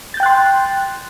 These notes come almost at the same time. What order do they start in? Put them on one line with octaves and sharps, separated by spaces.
A6 G6 G5 F#6 C6